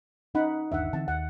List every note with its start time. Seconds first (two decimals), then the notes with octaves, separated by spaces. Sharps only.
0.35 C#4 D#4 F#5 B5
0.72 G1 D#2 D4 E5 F#5
0.93 D3 E3 C4 A5
1.08 D#2 F#5